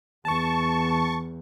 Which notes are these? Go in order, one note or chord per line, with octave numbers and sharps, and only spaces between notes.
E2 A5 C#6